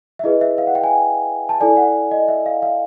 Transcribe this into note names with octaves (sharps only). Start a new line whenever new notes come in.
E5
E4 G#4 B4 D#5
E5
F5
F#5
G5
G#5
A5
E4 A4 D5 G#5
F#5
D#5
E5
F5
F5